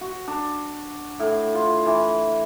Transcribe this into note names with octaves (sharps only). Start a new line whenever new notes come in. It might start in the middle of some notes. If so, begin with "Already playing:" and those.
F#4
D4
A2
F4
E3